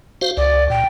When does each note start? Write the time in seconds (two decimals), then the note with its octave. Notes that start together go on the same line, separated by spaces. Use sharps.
0.21 F#4 C5 F5
0.37 C#2 D5
0.70 A#2 G5